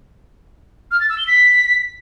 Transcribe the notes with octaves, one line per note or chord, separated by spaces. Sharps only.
F6
A6
E6
G7
B6